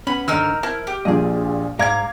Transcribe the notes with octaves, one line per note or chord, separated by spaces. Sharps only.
B3 C#4 B5
G#2 D3 D#3 D#4 A#4 E6 F6
E4 A#4 C5 A5
G4
A#1 A#2 G#4 D#5
G#2 D5 F5 A#5 D6 G#6